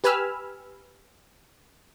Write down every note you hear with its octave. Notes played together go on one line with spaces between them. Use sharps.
G4 B4 G#5 B5 E6 F6